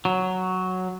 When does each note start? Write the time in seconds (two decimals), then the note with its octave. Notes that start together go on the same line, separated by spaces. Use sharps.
0.05 F#3